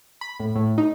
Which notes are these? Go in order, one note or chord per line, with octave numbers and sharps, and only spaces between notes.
B5
A2
A2
D#4